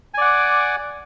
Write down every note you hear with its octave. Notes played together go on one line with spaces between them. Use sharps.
D5 F#5 G#5 D6